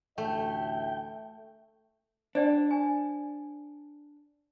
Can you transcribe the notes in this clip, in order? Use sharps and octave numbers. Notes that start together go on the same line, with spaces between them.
A1 D2 A3 E5 G5
D4 C5 D5 G5
G#5